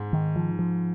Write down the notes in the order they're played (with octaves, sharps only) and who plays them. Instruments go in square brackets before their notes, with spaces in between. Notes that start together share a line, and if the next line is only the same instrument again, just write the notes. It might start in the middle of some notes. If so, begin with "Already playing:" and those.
Already playing: [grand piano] G#2
[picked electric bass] D#3
F3
F3